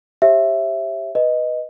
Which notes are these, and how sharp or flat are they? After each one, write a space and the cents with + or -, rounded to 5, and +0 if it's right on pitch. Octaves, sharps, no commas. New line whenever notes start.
G4 +0 C#5 -45 E5 +5
B4 +0 D#5 +0